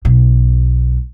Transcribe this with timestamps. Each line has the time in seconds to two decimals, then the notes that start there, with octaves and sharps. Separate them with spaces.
0.05 B1 B2